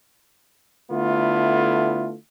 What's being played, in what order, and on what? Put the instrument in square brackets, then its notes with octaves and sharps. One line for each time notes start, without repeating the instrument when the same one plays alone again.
[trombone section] D3 A3 B3 E4 F4